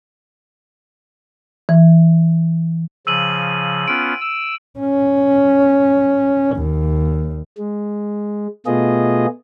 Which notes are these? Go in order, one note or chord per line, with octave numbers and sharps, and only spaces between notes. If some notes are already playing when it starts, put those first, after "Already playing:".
E3
C#3 F3 E6 D#7 F#7
B3 C#4 F4 D7
E6
C#4
D#2
G#3
B2 A3 B3 F4 G#4 D#5